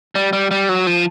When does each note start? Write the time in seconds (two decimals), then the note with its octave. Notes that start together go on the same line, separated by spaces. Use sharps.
0.15 G3
0.33 G3
0.51 G3
0.69 F#3
0.87 F3